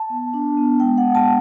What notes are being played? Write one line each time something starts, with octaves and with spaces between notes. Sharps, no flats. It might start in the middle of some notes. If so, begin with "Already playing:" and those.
Already playing: A5
B3
D4
B3
G#3 G5
F#5
B3
A5